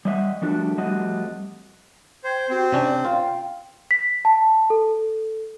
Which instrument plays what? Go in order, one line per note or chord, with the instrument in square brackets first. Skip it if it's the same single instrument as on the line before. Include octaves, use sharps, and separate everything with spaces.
[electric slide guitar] G3 D#5 E5 F#5
F3 G3 A3 D4 F#4
F3 G3 A3 C4 F#4 D#5
[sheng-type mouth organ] C5 [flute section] G5 G#6
[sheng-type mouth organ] C4 [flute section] F#4 G4
[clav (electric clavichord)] C3 C#4 D4 [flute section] D5
[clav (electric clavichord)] F4 [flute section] F5 G5
[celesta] B6
A5
A4